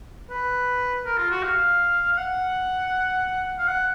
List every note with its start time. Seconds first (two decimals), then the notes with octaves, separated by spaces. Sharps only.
0.30 B4
1.05 A#4
1.18 F4
1.31 F#4
1.43 F5
2.13 F5
2.18 F#5
3.58 F5
3.68 F#5